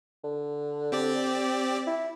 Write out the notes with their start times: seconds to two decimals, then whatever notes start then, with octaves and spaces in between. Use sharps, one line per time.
0.24 D3
0.92 C4 G4 D5
1.87 E4